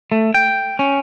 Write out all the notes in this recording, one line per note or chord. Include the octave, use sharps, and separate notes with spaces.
A3
G5
C#4